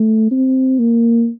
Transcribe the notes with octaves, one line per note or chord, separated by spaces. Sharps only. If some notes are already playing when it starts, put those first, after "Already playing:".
Already playing: A3
C4
A#3